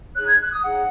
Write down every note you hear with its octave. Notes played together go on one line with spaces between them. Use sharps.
D#4 G#4 C#5 F#6
G#6
F#6
D#6
D#4 G#4 C#5 F#5